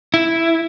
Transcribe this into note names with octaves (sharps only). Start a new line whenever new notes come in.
E4